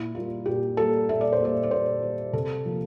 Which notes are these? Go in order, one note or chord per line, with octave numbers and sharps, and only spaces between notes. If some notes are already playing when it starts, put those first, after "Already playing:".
Already playing: A#2 E4
G3 A#3 F4
A#2 G4
G3 A#3 A4
A#2 E5
D5
C5
G3 A#3 D5
D5
A#2 C5
G3 A#3
C3 A4
F3 A#3